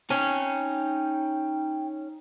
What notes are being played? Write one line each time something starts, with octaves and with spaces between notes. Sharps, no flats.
C#4 D#4 G5 A5